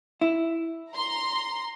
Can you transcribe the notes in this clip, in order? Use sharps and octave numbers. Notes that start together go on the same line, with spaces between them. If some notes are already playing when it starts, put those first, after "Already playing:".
E4
A#5 C6